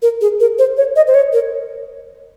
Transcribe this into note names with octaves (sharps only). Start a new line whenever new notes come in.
A#4
G#4
A#4
C5
C#5
D#5
C5
C#5
A#4